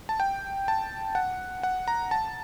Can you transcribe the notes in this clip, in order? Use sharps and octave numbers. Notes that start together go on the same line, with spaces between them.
A5
G5
A5
F#5
F#5
A#5
A5